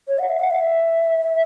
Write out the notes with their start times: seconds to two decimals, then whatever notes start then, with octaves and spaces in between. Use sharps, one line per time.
0.08 C#5
0.19 F#5
0.29 E5
0.40 F#5
0.51 E5